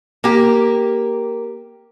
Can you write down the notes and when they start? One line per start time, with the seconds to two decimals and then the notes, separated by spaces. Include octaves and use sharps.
0.24 A#3 G4